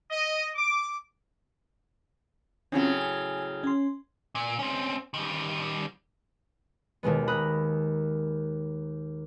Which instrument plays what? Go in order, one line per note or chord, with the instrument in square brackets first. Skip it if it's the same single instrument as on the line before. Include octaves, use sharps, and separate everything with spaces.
[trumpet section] D#5
D6
[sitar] A2 C#3 F#3 [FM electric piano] C4 C#4 F4
[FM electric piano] G#5 E6
C#4 C6
[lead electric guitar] A#2
C4 C#4
D#3 G3
[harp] D#2 B2 G#3 B3
A#5 B5 D#6 F#6